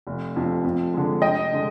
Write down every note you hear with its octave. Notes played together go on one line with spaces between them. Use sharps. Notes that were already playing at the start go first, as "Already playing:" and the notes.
F1
F2 C3
F2
D3 G#3
F1 D#5 G5
D3 G#3